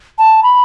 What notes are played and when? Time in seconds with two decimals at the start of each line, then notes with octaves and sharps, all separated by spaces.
0.19 A5
0.43 B5